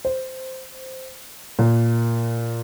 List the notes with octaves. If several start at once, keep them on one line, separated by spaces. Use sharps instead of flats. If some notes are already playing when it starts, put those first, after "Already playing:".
C5
A#2